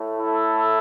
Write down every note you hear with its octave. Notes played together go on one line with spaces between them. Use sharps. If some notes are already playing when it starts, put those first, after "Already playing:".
Already playing: A2 A3
E4 A4